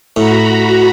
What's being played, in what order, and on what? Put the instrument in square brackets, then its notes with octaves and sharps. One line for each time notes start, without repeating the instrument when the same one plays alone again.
[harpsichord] A2 [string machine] F#4 A#5 B5